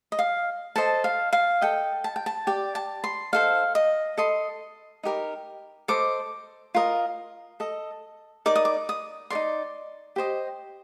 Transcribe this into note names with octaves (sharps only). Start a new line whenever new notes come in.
D#5
F5
A4 C5 D#5 A5
F5
F5
A4 D#5 G5
A5
G5
A5
G4 D5 G5
A5
C6
D#4 A4 C5 F5
D#5
A4 D#5 C6
D#4 G4 A#4
A4 C5 D#5 D6
F4 A#4 D#5
A4 D#5
D#4 A#4 D5 D6
D#6
D6
D#6
D#4 A#4 D5 C6
G4 C5 D#5